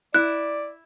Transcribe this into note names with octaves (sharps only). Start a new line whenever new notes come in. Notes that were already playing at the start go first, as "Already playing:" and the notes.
E4 D5 F#6